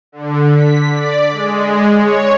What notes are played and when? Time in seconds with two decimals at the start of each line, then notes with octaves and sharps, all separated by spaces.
0.12 D3
0.55 B6
0.92 D5
1.30 G#3
1.96 C#5